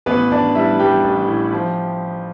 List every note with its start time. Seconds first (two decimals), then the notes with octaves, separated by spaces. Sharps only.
0.06 A1 B3 B4
0.31 A1 D4 D5
0.55 G3 E4 E5
0.79 G3 G4 G5
1.04 A1
1.28 A2
1.53 F3